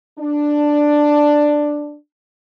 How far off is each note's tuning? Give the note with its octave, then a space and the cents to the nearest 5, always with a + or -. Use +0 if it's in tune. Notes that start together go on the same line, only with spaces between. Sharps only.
D4 +5